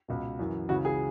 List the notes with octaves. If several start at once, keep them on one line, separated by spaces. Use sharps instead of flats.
C#2 B2
F#2 E3
C#2 C#3 E3 F#4
G#4